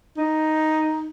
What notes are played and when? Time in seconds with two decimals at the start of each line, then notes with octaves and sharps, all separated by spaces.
0.17 D#4